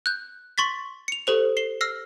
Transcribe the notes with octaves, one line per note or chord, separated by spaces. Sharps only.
F#6 G6
C6 C#6 A6 B6
C#7 F7
G4 A4 C5 F7
C7 E7 G7
E6 F6 A#6 C7